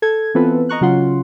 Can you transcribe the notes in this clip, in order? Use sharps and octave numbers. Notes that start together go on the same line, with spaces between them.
A4 G#6
E3 B3 C4 F4 A4 B4
D#5 A#5 C#6 F#6
C#3 F#3 C#4 F4 F#5 C6